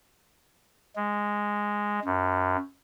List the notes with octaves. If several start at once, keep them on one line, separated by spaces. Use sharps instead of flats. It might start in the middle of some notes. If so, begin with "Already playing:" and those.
G#3
F#2